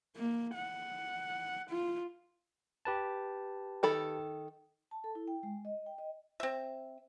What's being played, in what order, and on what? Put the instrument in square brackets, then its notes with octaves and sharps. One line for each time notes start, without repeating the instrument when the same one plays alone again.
[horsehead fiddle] A#3
F#5
F4
[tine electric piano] G4 B4 A5
[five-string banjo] D#3 A4 B5
[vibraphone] A5
A4
E4
G5
G#3
D#5
G5
D#5
[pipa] C4 E5